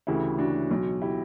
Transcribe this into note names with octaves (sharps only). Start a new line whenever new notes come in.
D2 C#3 E3 E4 G4
D4 F#4
B1 B2
E4 G4